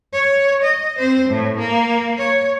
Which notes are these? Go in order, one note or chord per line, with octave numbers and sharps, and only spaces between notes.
C#5
D#5
C4 C5
A2
A#3
C#5